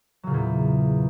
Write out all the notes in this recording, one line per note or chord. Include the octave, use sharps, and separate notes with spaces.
E2 A#2 C#3 F#3